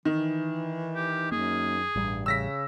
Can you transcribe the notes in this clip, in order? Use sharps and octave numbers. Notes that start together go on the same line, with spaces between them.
D#3 E3
G4
F#2 A#3 G#4
A1 G2 G3
C#3 E6 A#6 B6